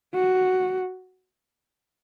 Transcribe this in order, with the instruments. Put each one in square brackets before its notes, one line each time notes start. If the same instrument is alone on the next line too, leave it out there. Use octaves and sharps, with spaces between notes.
[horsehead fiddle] F#4